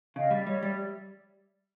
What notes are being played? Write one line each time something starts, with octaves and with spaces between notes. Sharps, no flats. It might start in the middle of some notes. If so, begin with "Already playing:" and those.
C#3 D#5 F5
G3 D5 E5
G3 C#5 D#5
G3 D5 E5